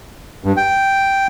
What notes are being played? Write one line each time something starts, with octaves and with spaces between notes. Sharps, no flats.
G2
G5